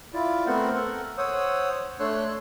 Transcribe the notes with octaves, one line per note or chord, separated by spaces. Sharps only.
E4 F4 D5
A3 B3 C4 A#4 C5 F#5
A4 A#4 F#5
C5 C#5 F#5 D#6 E6
A3 D4 C#5 C6 E6 F#6